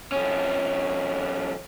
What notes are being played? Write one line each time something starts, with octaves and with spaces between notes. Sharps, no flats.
F2 C#4